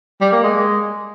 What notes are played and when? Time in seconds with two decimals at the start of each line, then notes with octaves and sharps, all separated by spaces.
0.21 G3
0.32 A#3
0.43 G#3